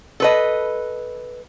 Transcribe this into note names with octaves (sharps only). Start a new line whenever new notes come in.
A4 B4 D#5